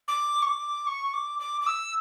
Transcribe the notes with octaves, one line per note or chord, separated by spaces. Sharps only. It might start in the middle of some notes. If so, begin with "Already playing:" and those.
D6
C#6
D6
C#6
D6
D6
D6
E6